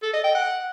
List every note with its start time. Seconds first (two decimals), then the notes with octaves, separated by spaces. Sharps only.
0.03 A4
0.13 D#5
0.24 G5
0.35 F#5